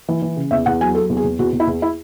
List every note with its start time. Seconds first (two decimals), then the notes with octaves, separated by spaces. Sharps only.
0.08 E3
0.22 E3
0.36 C#3
0.51 E2 E5
0.66 E2 F#5
0.81 F#3 G#5
0.95 F#3 A4
1.09 E2
1.17 G#4
1.24 E2
1.39 E2 F#4
1.53 E2
1.60 E4
1.67 E2
1.82 E4